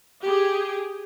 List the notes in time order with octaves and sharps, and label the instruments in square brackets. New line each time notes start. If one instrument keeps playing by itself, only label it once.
[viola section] G4 G#4